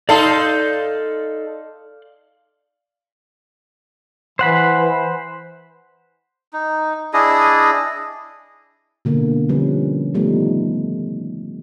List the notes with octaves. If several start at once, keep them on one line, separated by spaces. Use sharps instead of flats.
D#4 A4 D5 F5 C6
E3 C5 F#5 B5
D#4
D4 E4 G#4 D#5
B2 D3 A#3
D3 F3 G3 C#4 B4
D#3 F3 G3 A3 B3 D#4